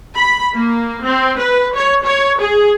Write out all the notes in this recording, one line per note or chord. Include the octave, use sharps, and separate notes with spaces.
B5
A#3
C4
B4
C#5
C#5
G#4